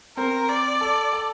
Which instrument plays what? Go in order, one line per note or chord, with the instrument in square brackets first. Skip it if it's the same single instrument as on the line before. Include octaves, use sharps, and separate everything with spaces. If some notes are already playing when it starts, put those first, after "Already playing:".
[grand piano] C4 C5 [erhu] A#4
[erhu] D5
[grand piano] A4 A5
A4 A5